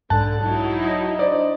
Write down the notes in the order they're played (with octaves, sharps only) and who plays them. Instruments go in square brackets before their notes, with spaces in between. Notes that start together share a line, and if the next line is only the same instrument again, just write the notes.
[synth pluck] B1 G#2 F#6 [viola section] D3 [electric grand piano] A5
[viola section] F#3 D#4 E4
[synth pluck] D#5 A#5
[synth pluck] D4 C5 D#5 [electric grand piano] D5